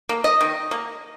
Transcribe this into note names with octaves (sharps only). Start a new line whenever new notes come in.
A#3
D#5
D#3
A#3